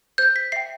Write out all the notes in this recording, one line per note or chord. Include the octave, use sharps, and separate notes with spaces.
C5 G6
B6
E5 G5 C7